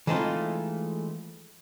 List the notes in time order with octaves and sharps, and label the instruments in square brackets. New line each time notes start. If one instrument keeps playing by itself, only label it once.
[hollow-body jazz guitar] E3 G#3 A3 C4 D#4 F4